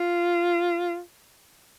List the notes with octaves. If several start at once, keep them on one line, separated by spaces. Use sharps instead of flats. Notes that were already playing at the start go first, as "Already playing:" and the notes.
Already playing: F4